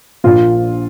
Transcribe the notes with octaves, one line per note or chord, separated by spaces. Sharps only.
A#1 A#2 F3 F4